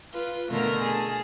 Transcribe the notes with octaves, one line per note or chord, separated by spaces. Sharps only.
F4 B4
B2 D3 A3 A#4 F6
G#4 A5